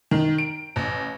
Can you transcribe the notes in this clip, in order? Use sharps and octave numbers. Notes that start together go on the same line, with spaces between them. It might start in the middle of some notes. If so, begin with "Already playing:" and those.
D#3
D7
A1